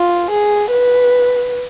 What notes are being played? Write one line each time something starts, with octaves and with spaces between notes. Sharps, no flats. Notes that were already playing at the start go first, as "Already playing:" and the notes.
Already playing: F4
G#4
B4